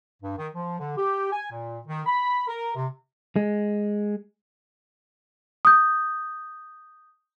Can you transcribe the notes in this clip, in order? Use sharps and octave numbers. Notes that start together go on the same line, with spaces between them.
G2
D#3
F3
D3
G4
G#5
A#2
D#3
B5
A#4
C3
G#3
D#6 G6